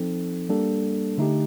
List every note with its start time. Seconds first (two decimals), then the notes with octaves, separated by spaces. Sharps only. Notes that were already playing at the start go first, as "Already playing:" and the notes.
Already playing: F3 C4 D#4 A4
0.49 G3 A#3 D4 A4
1.18 D3 A3 D#4 G4